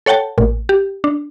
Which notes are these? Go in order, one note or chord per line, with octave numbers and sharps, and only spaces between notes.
A4 C#5 F#5 G5 A5
A1 A#2
G4
D4